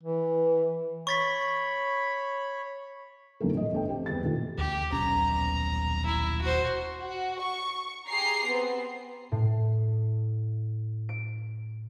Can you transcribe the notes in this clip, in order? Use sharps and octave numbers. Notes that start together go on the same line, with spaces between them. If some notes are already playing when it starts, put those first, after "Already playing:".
E3
C#5 B5 C#6 A6 B6
B1 F2 D3 A3 A#4
A2 D#5
G1 A3 G5
C4 G4 G5
E2 G3 A6
A#2 D#3 A3 A#3
D2 G4
D#1 B1 C#4 A#5
E4
F#4 C5
F#4
C#6
G4 G#4 A#5 C7
B3 C4
A2
D7